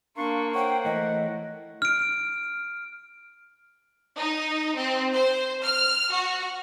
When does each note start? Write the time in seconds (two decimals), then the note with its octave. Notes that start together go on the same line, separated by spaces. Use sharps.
0.17 A#3 D4 F5 C6 C#6
0.55 C5 C#5 F#5 G5
0.85 E3 A3 D#5
1.82 F6 D7
4.16 D#4
4.77 C4
5.15 C5
5.62 F6
6.11 F#4